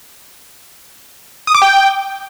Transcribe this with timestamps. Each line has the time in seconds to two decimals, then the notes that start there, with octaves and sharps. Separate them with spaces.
1.47 D#6
1.55 D6
1.62 G5